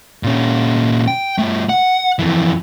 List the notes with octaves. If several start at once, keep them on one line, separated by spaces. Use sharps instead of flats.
A#2 C#4
G5
G2 A3
F#5
F2 E3